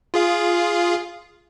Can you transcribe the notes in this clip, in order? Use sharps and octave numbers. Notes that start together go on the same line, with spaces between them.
F4 G#4 F5